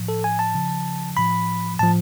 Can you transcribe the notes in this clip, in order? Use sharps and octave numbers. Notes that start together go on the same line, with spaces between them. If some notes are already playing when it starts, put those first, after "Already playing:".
Already playing: A2 F3
A4
G#5
A5
C#3 F3
A2 F3 B5
A2 F3 A5